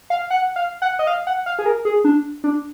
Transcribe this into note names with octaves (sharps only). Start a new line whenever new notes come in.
F5
F#5
F5
F#5
D#5
F5
F#5
F5
G#4
A#4
G#4
D4
D4